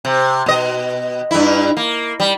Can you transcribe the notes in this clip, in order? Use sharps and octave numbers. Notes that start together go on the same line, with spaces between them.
C3
B2 D#5
G2 E4
A#3
G3